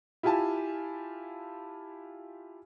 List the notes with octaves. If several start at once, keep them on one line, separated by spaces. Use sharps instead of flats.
E4 F4 G4 G#5 A5